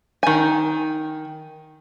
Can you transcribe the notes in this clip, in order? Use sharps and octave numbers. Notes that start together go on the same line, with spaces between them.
D#3 G#5